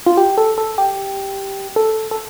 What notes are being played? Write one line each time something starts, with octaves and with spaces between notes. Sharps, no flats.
F4
G4
A4
A4
G4
A4
A4